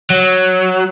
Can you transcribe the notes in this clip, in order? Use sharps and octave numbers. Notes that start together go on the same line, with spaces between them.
F#3